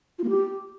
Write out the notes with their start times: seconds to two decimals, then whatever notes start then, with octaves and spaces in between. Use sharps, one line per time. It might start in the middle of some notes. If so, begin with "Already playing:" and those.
0.19 F4
0.24 A#3
0.29 G4